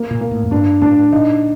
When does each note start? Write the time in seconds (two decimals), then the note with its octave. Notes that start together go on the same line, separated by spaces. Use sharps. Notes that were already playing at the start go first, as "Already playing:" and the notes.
Already playing: A#3
0.11 A#2
0.21 A#3
0.31 A2
0.43 F2
0.51 G2 D4
0.82 A2 D4
1.12 A#2 D#4